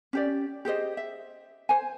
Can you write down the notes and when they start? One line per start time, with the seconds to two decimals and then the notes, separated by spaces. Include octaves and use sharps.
0.13 C#4 G4 D5
0.65 G4 G#4 C5 D#5
0.97 E5
1.69 C5 G#5